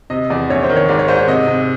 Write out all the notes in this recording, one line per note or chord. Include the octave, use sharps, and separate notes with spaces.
C3 D#5
E2 D5
A#1 C#5
C5
D#3
C#5
G#2 D5
C#5
G#2 C5
C#5
C3 D#5
C3